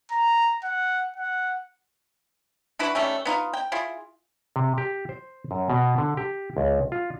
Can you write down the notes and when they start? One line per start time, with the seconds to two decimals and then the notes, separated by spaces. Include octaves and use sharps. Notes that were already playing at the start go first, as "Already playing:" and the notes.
0.12 A#5
0.64 F#5
1.17 F#5
2.79 D4 E4 F#4 B4
2.95 D#3 G3 A3 C#4
3.25 B3 D#4 F4
3.53 G5
3.72 E4 F4 G#4
4.56 C3
4.78 G4
5.09 C5
5.51 F#2
5.70 B2
5.98 D3
6.17 G4
6.57 C#2
6.92 F4